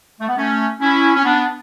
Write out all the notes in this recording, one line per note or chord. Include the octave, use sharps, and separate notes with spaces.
A3
B3
A3 C#4
C#4 E4
C#4
B3 D4